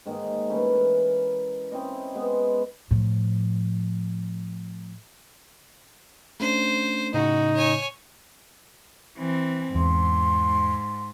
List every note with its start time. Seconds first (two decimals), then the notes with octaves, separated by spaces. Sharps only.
0.06 G#2 D#3 A#3 G#4
0.49 E3 A3 C#4 E4
0.73 A#4
1.72 C4 C#4 E4 D#5
2.15 G#3 B3
2.91 A2 F3
6.40 A3 C#4 D4 C5
7.14 A2 C#3 D#4 F#4
7.55 C#5 G#5
9.18 E3 C4
9.75 E2 G#2 C6